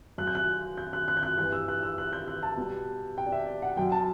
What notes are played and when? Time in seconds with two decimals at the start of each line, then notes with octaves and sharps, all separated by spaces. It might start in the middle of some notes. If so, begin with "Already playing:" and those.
0.18 F#2 F#6
0.22 F#3 G6
0.35 F#6
0.77 G6
0.93 F#6
1.08 F#6
1.17 G6
1.23 F#6
1.37 G2 E3 G3 F#6
1.53 E6
1.68 F#6
1.83 E6
1.98 F#6
2.13 G6
2.28 F#6
2.43 A5
2.57 B2 G3
3.18 G5
3.26 D5
3.32 E5
3.47 D5
3.62 F#5
3.77 F#2 F#3 G5
3.92 A5